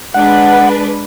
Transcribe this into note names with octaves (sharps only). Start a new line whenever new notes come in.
G#3 D4 B4 F#5